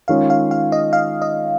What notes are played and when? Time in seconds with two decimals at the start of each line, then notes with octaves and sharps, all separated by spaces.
0.08 D#3 G#3 C#4 F4 C#5 F5
0.30 F5
0.51 F5
0.72 D#5
0.93 F5
1.22 D#5